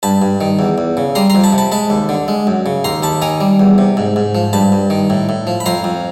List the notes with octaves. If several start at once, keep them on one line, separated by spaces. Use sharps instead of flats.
G2 A5 B5
G2
D#3
E2
E2
C#3
G3 A#5 C6
A#5 C6
F2
A5 B5
C3
A5 B5
G#3 A5 B5
D#2
D3
G#3
F#2
C#3
D#2 A#5 C6
D#2 A5 B5
D#3 G#5 A#5
G3
E2
C3
G#2
G#2
F3
G2 A5 B5
G2
D#3
A2
A2
F3
B5
F2 A#5 C6
F2